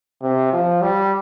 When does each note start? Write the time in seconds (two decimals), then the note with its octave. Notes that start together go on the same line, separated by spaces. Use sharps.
0.22 C3
0.53 F3
0.82 G3